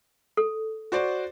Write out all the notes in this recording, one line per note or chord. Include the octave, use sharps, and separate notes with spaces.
A4
F#4 C5 D5